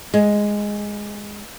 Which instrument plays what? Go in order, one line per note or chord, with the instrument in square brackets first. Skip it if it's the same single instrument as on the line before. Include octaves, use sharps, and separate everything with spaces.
[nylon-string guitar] G#3